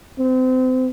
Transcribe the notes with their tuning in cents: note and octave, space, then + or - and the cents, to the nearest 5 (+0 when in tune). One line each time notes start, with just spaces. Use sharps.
C4 -30